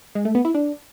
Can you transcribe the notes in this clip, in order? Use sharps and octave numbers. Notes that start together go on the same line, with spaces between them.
G#3
A3
B3
E4
D4